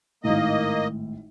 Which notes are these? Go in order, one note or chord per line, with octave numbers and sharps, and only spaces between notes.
G#1 A2 A#3 D#5